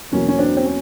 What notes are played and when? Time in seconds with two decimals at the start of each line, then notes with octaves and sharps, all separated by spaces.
0.12 E2 B2 F#3 A#3 C#4
0.28 C#4
0.38 C4 D4
0.57 C4
0.64 C#4